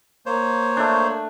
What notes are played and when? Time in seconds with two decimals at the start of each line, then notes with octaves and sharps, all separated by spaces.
0.26 A#3 C5 C#5
0.77 A3 D4